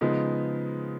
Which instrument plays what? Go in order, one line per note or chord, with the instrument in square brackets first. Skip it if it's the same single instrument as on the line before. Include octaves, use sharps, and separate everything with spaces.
[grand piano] C#3 F3 G#3 B3 D#4